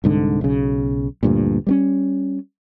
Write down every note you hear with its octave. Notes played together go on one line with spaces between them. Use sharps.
C2 G#2 D3
B1 C#3
D2 G2 A#2
G3 A#3 C#4